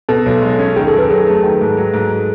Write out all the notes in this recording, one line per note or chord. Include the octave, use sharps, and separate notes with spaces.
B2 A4
B1
G#3
C#4
D#3 G#4
A4
F#2
B4
F#3 G#4
A3
D#3
G#2
F#3
G#2